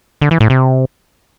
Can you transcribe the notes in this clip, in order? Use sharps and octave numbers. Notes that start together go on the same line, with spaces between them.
D3
E3
A2
C3